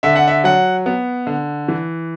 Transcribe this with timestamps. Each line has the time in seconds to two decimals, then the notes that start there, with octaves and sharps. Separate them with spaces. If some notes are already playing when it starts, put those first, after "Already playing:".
0.03 D3 E5
0.16 F#5
0.28 E5
0.44 F#3 F#5
0.86 B3
1.27 D3
1.68 E3